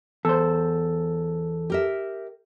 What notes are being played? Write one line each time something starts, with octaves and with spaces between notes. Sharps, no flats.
E2 A4 C5
G4 A#4 E5